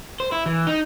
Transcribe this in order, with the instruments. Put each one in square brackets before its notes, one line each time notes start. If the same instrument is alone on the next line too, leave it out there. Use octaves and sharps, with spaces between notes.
[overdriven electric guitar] C5
E4
E3
D#4